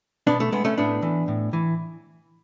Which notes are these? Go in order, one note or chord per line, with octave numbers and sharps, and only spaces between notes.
B2 B3 D4
A3
G#3 B3
A3 C#4
A2 B3 D4
E3
A2
E3